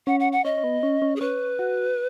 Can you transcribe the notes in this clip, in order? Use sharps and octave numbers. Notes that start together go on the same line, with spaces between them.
C#4 F#5
F#5
F#5
C#4 D#5
C#4
B3
C#4
C#4
G#4
C#4 B4
F#4